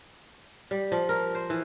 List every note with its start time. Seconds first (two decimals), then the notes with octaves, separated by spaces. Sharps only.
0.71 G3
0.92 F3
1.09 A#4
1.35 C5
1.50 E3